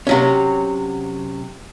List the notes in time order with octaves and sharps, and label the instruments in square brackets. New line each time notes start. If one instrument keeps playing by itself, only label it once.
[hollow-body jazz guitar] C3 F#3 C#4